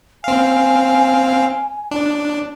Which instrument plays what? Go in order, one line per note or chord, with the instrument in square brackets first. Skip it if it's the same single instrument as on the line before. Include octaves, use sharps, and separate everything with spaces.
[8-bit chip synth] C4 F5 [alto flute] G#5
[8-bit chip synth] D4